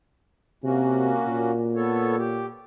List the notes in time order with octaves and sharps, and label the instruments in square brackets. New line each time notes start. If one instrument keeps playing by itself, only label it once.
[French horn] C3 [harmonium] A#3 C#4 F#4
[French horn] A#2
[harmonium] B3 A4 C#5
G4